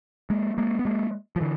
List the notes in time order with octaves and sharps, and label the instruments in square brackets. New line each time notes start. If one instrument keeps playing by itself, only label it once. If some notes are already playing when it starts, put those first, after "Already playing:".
[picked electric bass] G#3 A#3
G#3 A#3
B3
G#3 A#3
F3
D3 E3